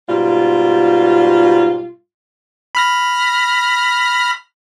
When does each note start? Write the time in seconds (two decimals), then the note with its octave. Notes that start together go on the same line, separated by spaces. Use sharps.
0.09 G#2 B2 G3 F4
2.75 B5 F6 A#6